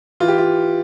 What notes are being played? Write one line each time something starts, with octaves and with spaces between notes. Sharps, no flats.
E3 F4
G4
F4